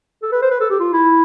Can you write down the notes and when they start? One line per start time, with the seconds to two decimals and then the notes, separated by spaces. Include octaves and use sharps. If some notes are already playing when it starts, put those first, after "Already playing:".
0.23 A4
0.32 B4
0.42 C5
0.51 B4
0.61 A4
0.70 G4
0.80 F4
0.93 E4